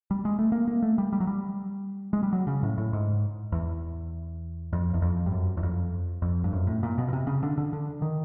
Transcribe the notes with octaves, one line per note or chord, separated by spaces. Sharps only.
G3
G#3
A3
A#3
A#3
A3
G3
G3
F#3
G3
G#3
G3
F#3
C#3
A2
A2
G#2
E2
F2
E2
F2
G2
F#2
E2
F2
F2
G2
F#2
A2
A#2
B2
B2
C3
C#3
D3
D3
D3
D#3